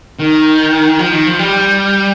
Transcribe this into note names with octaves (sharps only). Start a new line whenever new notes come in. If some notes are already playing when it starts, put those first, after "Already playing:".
D#3
F3
D#3
F3
G3